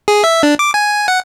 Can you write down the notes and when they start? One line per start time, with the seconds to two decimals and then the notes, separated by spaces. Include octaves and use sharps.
0.08 G#4
0.24 E5
0.43 D4
0.59 D6
0.74 G#5
1.08 F#5